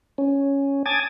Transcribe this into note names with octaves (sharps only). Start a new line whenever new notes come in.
C#4
G#5 A5 D6 D#6 G#6 A6